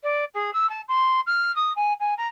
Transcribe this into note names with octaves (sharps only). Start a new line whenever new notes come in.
D5
G#4
E6
A5
C6
F6
D#6
G#5
G#5
A#5